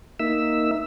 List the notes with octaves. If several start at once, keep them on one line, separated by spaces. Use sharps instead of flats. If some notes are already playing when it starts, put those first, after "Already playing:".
A#3 D#4 E5 E6